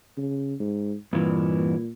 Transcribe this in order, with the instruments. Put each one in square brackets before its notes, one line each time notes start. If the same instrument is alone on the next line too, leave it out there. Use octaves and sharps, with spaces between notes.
[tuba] C#3
G#2
[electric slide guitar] G2 E3 [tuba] A#2